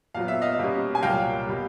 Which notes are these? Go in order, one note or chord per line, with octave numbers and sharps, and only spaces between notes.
A#2 F#3 B3 F5
E5
D#5 F5
B2 G3 A#3 C#4
G#5
C2 A#2 F#3 A#3 F5 G5
B2 G3